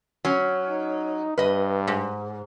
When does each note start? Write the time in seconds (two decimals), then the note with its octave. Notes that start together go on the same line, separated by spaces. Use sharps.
0.25 F#3 C#4
0.69 D#4
1.38 G2 B4 D#5
1.87 G#2